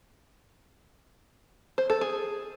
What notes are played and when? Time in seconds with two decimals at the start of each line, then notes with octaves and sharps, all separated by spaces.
1.78 C5
1.90 A4
2.01 G#4